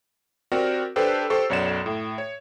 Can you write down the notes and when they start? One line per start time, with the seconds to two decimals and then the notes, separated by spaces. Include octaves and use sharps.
0.52 C4 F#4 G4 A#4 D5 F#5
0.96 D4 G4 A4 B4 C5
1.30 G4 A4 C5 C#6
1.50 B1 F#2 C#5 D5 F#5 E7
1.86 A2
2.18 C#5